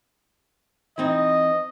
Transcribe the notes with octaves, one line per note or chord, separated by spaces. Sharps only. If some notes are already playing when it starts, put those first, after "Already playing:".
E3 C4 D#4 D#5